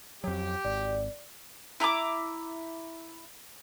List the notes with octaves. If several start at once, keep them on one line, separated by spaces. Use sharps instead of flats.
F2 F#3 G4
G#1 D5
E4 A#5 B5 D6